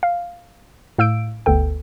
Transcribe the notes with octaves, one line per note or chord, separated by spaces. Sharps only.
F5
A2 F5 E6 G6 D7
G1 D2 B3 A4 G5